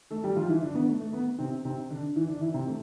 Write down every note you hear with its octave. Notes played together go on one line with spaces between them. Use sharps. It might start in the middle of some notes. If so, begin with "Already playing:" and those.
A3 A4
G3 G4
F3 F4
E3 E4
D3 D4
B3
A3
A3
B3
C3 C4
C3 C4
D3 D4
E3 E4
D3 D4
E3 E4
C3 C4
A3